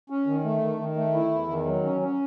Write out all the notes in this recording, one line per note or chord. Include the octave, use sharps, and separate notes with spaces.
C#4
D#3
A3
D#3
D#3
A3
E4
E2
D#3
F#3
C#4
C#4